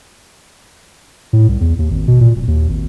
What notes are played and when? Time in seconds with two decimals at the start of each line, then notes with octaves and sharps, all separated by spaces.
1.33 A2
1.48 C2
1.61 E2
1.79 D#2
1.91 G#1
2.08 B2
2.21 A#2
2.36 D1
2.48 D#2
2.69 G#1